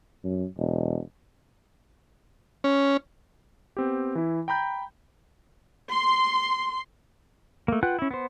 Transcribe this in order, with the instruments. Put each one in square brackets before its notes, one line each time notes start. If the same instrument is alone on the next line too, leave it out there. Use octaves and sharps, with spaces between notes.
[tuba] F#2
E1
[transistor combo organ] C#4
[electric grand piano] B3 C4 G4
E3 E4
G5 A#5 B5 G6
[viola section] C6
[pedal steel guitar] A3 A#3
F4 B4 F#5 G5 F#6
C#4 E4
B3 C5